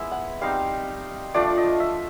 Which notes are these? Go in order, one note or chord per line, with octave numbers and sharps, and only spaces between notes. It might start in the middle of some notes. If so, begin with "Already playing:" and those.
Already playing: G#3 B3 E4 E5
F#5
G3 C4 D#4 F5
F3 A3 D4 F4 D5
D#5
E5